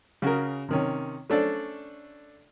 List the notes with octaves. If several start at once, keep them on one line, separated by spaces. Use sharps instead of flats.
C#3 F#4 G#4 A#4
C3 D#3 C#4
A3 C#4 D4 A4 C5 D5